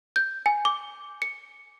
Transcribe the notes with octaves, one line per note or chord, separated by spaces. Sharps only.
G6
G#5
D6
C#7